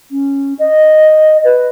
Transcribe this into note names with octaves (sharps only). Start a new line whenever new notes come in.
C#4
D#5
B4